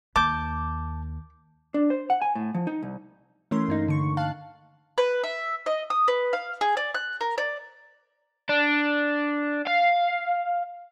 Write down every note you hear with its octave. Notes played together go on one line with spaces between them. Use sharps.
D#2 A5 D6 G6
D4
C5
F#5
G#5
A2
F3
D#4
C2
E3 A3 C#4 A#4 C6
G2 A#3 D#4
D3 C#6
F5 A5 F#6
B4
E5
D#5
D#6
B4
F5
G#4
D5
F#6
A#4
D5
D4
F5